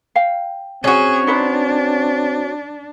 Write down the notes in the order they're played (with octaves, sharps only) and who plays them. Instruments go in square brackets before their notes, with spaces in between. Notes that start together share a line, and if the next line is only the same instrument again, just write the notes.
[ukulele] F5 G5
[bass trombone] C4 [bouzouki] C#4 F#4 [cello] G#4
[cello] D4 [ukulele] D#4 B4 C5